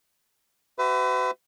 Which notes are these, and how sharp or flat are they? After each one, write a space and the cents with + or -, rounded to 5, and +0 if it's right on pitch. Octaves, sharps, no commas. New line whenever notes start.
F#4 +30 B4 +40 E5 +0